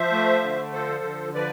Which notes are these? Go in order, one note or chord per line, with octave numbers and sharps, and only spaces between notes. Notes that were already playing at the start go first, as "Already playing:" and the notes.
Already playing: F3 C5 E5
A3
D3
F3 A4 C5
D3
F3 B4 D5